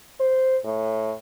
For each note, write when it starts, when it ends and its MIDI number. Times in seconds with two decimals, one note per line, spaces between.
0.20 0.57 72
0.64 1.14 45